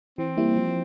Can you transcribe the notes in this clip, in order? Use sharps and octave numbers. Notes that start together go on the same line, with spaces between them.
E3 C4
G3 A#3 E4
F3